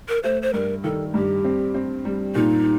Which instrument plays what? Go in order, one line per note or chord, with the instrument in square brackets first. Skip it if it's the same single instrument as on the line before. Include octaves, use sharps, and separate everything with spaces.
[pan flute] A#4
[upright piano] A3 [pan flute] C5
[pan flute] C5
[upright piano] G2 [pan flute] A#4
[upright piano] D#3 [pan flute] A4
[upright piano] G2 [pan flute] G4
[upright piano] C4
C4
G3
[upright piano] A#2 [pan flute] D#4